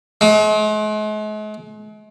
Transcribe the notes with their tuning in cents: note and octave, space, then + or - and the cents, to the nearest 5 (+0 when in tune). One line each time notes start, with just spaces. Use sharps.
G#3 +45